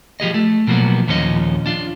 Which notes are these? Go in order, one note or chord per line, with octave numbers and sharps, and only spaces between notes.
F3 G4 G#4 D#5
A3
B2 F3 F#3 A#3 B3
D#2 A#2 F3 C#4 A4 D#5
D4 F4